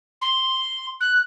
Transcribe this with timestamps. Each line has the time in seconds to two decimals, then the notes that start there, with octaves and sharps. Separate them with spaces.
0.22 C6
1.01 F#6